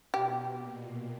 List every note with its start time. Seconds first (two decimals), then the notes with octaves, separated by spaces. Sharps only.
0.14 B2 G4
0.60 A#2